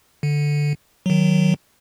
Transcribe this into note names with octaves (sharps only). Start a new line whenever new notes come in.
D3
D#3 F#3